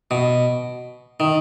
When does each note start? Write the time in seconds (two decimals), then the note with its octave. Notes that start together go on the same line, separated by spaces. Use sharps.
0.11 B2
1.20 D#3